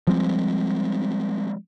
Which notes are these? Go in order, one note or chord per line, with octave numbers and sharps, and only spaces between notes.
F3 G3 G#3 C4